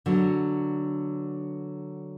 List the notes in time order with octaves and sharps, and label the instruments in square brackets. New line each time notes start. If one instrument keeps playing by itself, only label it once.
[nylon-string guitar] D3 F#3 B3